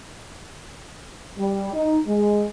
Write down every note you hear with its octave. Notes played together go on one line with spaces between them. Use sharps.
G3
D#4
G#3